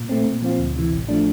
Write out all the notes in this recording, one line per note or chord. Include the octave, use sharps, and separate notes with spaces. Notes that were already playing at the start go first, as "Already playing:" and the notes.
Already playing: A#2
A3 C4
A#2
F3 C4 F4
D2
C3 E3
A1
F3 A3 D4